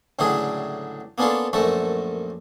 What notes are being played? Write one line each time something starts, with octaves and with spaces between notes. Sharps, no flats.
C#2 A2 D3 F#3 D4 G#4
A#3 B3 C#4 D4 F4 A4
A#1 F#2 A3 F#4 A4